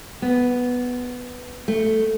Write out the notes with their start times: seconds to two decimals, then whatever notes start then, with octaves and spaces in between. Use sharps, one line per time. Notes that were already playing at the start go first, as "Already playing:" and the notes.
0.22 B3
1.68 A3